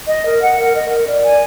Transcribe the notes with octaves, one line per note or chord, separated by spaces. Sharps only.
D#5
A#4
F#5
A#4
D#5
A#4
D5
G#5